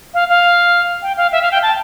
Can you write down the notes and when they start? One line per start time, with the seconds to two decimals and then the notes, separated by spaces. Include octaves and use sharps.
0.14 F5
0.29 F5
1.02 G5
1.17 F5
1.32 E5
1.42 F5
1.52 G5
1.62 A5